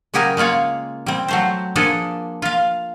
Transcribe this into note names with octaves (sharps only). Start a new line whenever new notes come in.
C#3 F#3 G4 G#4 A#4 G#5
G#3 A#3 F4 C#5 F5
G3 C4
F#3 A3 C5
F3 A#3 D4 G#4 A4
F4 F5